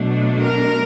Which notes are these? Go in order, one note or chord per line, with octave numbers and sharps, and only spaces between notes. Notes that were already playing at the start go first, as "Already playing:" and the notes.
Already playing: B2 F#3 A3 D4
A#4